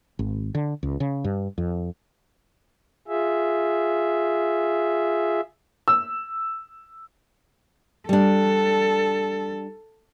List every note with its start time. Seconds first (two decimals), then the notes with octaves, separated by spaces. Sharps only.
0.19 G#1
0.55 D3
0.83 C#2
1.00 C#3
1.24 G2
1.58 F2
3.08 F4 G#4 E5
5.88 E6
8.09 G3 D4 A4